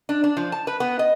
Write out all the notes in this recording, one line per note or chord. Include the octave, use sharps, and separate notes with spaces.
D4
D4
F3
A5
B4
B3
D#5